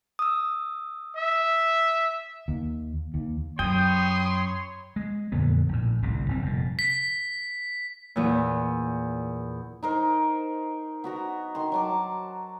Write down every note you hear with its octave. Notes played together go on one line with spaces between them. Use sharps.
D#6 E6
E5
D#2
D#2
F#2 C#5 G5 B5 C6 D#6
G#3
F2 A#2 D3 B3
A#1 A2
G1 C2 A2 C3
F#1 G3 C4
F1 A#2
B6
E2 A#2
D#4 A#4 C5
B3 F#4 A#5
D#3 C6
F#3 A5 D6